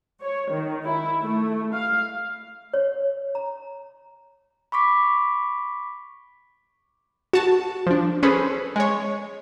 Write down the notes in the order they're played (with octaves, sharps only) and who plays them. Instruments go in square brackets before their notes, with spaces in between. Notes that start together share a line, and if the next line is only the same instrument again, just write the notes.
[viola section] C#5
D#3
E4
A3
F5
[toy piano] C#5
A#5
[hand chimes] B5 C#6 D6 B6
[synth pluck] F#4 A5
F3 D4
C#4 G#4 A4 B4 C5
G#3 C#5